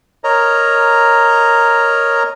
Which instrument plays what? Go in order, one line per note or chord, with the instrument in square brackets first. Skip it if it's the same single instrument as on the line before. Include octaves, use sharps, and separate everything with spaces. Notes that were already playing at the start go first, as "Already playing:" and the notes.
[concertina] A#4 C#5 D#5 A#5